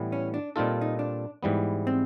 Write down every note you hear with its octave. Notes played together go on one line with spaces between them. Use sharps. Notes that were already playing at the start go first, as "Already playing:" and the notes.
Already playing: A2 E3 G3 B3
C#4
D4
A#2 G3 C4 D#4 F4 A4
D#4
D4
G#2 E3 G3 B3
C4